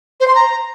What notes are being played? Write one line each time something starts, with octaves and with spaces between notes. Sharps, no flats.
C5
C6
A#5